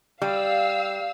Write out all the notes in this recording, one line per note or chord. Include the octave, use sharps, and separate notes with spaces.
G3 F5 E6